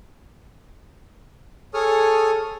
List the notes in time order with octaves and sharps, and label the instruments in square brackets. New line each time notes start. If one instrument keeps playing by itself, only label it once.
[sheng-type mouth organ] G#4 A4 C#5 D#6 F6